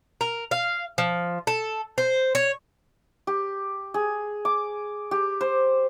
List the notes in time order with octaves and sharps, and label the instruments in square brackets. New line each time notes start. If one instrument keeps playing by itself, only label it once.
[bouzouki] A#4
F5
F3
A4
C5
C#5
[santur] G4
G#4
D6
G4
C5